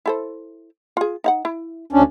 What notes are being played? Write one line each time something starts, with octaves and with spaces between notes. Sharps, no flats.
E4 A4 C5
F4 G#4
D#4 F5 F#5
E4
D2 C#4 D4